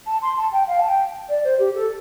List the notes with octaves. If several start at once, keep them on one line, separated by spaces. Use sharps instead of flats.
A5
C6
A5
G5
F5
A5
G5
D5
C5
G4
A4